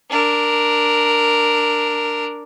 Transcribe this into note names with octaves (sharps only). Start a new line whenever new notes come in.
D4 A#4